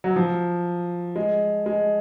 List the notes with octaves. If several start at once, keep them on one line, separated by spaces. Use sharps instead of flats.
F#3
F3
G#3
G#3